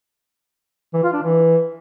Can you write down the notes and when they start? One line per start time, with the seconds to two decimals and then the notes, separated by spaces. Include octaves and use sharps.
0.94 E3
1.04 F4
1.13 D4
1.23 E3